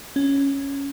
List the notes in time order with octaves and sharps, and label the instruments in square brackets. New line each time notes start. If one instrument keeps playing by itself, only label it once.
[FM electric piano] C#4